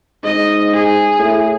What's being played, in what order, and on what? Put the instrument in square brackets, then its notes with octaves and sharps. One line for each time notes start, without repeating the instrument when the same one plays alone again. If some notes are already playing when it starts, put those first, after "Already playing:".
[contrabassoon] G#2 [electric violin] D#5
[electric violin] G#4
[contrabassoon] A2